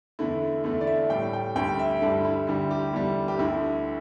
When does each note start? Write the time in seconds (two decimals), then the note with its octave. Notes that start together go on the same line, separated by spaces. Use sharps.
0.19 E2 D3 A3 E4
0.64 E2 D3 A3 E4
0.81 D5
0.87 E5
1.10 A2 G3 G5
1.33 G5
1.55 D2 D3 G3 G5
1.79 E5
2.02 G2 D3 G3 E4
2.25 E4
2.47 D2 D3 G3 E4
2.71 G4
2.93 E2 D3 G3 E4
3.28 G4
3.39 D2 D3 A3 E4